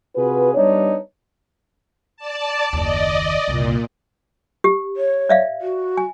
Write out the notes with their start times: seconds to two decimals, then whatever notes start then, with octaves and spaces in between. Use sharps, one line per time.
0.16 C3 F4 F#4 G#4 B4
0.55 G3 B3 D4 D#4 C#5
2.17 D5 A5
2.73 F#1 D#2 D5 D#5
3.48 F#1 C2 A#2
4.64 G4
4.97 C#5
5.29 D5 E5 F5
5.61 F#4
5.97 G#5